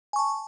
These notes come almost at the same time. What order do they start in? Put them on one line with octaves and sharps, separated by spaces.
G#5 C#6 A5